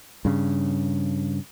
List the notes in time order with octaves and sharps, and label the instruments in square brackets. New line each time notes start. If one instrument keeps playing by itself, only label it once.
[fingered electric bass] G2 C#3